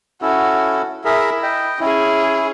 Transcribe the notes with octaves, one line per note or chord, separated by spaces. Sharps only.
C#4 E4 F#4 A4
E4 G#4 A#4 E5
D#5 G5
C#4 E4 G#4